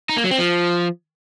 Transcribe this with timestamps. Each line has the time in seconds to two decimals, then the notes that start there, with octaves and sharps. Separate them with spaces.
0.09 D#4
0.17 A#3
0.24 F#3
0.31 C4
0.38 F3